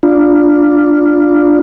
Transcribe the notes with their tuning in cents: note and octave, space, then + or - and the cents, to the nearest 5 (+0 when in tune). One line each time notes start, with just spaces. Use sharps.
D4 +0 F4 +0